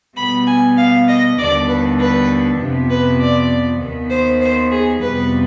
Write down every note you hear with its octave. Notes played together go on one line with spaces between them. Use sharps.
B2 G3 B3 B5
G#5
F5
D#5
D#2 D3 G3 B3 D5
B4
B4
F2 C3 F3 B3
B4
D5
D#2 D#3 B3
C5
C5
G#4
F2 C3 G3 B3 B4